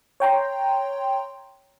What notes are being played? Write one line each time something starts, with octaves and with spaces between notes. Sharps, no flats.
C#5 G5 A#5 C6